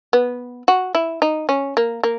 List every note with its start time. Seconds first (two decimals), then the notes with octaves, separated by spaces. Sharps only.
0.13 B3
0.68 F#4
0.95 E4
1.22 D#4
1.49 C#4
1.77 A#3
2.03 A#3